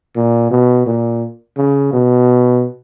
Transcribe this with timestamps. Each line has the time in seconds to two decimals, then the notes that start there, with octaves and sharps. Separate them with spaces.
0.16 A#2
0.51 B2
0.86 A#2
1.57 C#3
1.93 B2